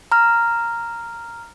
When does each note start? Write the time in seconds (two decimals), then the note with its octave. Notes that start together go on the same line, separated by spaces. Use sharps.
0.12 A#5 F6